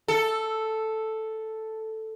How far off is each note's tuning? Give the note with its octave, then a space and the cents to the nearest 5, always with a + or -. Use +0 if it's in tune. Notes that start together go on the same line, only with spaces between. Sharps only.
A4 +0